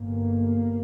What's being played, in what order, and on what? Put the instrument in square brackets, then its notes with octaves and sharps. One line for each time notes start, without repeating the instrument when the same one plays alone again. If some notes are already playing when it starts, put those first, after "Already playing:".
Already playing: [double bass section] G1 G2 A#3